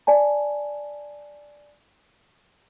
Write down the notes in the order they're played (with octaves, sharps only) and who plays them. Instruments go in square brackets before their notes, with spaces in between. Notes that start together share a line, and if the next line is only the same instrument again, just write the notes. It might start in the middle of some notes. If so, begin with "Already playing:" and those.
[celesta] D5 G#5 A5